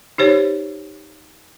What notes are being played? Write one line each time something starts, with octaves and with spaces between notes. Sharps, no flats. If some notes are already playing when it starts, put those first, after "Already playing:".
D#4 G4 C5 C#5